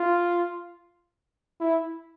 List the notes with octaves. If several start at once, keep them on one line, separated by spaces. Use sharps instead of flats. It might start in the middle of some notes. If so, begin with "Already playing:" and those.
Already playing: F4
E4